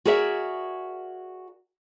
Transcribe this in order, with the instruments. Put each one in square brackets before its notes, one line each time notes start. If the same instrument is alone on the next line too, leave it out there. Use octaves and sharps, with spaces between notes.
[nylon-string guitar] F#4 G#4 A#4 D5 E5 F#5